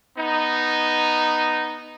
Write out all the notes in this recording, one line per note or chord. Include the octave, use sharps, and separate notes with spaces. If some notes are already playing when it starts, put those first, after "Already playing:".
B3 D#4